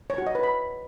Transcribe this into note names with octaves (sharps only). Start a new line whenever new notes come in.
C#5
F#4
D#5
B4
B5